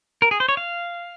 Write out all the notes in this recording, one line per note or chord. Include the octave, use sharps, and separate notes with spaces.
A#4
G#4
C5
C#5
F5